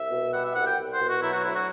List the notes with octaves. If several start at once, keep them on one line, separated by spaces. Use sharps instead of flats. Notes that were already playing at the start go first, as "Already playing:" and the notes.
Already playing: C2 E5
B2
G3 F#5
E5
C2 F#5
G5
C2
C5
B2
F#4
F#3 E4
F#4
D2 E4
F#4